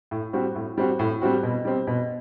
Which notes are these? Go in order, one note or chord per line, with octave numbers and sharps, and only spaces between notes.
A2
G3 C4 F#4
A2
G3 C4 F#4
A2
G3 C4 F#4
B2
G3 C4
B2